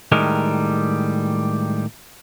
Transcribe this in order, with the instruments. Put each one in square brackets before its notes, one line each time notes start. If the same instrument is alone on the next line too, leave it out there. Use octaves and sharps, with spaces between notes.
[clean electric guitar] A2 D#3 G3 G#3 A#4